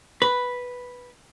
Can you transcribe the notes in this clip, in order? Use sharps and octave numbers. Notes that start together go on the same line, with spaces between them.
B4